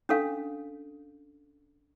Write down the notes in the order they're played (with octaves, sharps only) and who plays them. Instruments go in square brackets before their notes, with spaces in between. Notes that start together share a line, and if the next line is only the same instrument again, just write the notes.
[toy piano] C#4 D4 A4 F5